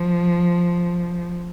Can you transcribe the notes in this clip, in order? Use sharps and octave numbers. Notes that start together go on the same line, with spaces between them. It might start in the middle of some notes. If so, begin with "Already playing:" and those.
Already playing: F3